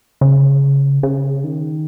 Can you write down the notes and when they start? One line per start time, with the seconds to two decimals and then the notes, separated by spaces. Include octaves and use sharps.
0.21 C#3
1.03 C#3
1.44 D#3